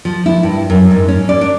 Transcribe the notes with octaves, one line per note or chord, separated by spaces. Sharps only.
F3
E4
G2
F#2
G#2
C#4
D5
D4